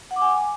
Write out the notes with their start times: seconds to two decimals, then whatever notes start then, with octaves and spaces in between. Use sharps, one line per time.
0.11 F#5
0.16 D6
0.22 G#5